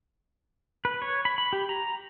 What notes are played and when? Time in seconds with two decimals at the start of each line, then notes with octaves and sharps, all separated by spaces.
0.85 B4
1.02 C#5
1.25 B5
1.38 B5
1.53 G4
1.69 A#5